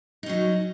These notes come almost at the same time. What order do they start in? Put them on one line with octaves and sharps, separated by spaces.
D#4 C#4 F#3